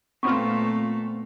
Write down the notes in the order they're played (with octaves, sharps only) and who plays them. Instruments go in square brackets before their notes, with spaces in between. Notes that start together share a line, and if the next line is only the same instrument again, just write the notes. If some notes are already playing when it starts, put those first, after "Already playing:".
[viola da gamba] A#2 A3 [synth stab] B3 C4 F4 [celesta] C#6